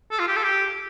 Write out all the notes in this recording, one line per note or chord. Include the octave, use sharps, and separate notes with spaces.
A4
F4
G4
A4
G4